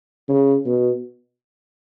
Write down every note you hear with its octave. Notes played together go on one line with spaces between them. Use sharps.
C#3
B2